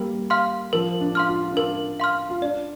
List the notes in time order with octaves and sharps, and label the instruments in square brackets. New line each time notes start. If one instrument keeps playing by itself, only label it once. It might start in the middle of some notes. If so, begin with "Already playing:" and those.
Already playing: [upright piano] G3 A#3 [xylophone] A#4
[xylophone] F5 C6 F6
[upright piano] F3 [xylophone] A#4
[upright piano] D4
[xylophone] F5 C6 F6
[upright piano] F4
D4
[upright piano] F4 [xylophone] A#4
[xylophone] F5 C6 F6
[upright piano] F4
[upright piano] D4 [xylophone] D5